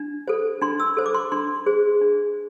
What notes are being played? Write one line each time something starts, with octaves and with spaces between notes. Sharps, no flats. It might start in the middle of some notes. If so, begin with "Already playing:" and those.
Already playing: D4
A4 C5
D4 C6
E6
A4 C5
D6
C6
D4 C6
G#4 C5
D4